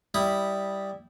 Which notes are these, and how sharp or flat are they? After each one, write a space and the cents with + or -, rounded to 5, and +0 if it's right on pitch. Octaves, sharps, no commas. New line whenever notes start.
G3 +0 E4 -10 D#6 +0